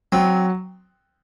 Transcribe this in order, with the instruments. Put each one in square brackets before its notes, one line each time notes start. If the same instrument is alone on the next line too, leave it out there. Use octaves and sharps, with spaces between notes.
[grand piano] F#3 [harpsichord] C4